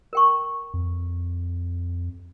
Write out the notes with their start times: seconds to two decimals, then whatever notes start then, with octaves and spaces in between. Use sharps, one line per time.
0.13 A#4 G5 C#6
0.74 F2